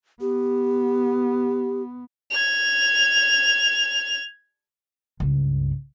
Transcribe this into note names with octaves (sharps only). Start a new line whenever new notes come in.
B3 G4
G#6 F7
C#2 G2